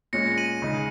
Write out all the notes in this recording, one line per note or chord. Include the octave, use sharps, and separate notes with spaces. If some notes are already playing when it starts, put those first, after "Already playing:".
A#2 G#3 C#4 A#6 C#7
D#7 F#7
C#3 G#3 D#4